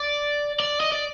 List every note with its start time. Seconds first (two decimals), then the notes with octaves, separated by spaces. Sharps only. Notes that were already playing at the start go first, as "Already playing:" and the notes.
Already playing: D5
0.60 D5
0.80 D#5
0.92 D5